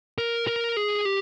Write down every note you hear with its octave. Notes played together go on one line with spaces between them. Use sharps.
A#4
A#4
G#4
G4